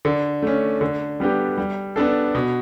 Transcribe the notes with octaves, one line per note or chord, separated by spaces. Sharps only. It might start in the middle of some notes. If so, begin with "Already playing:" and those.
D3
A3 C#4
D3
G3 B3 D4 G4
G3
B3 D4 A4
B2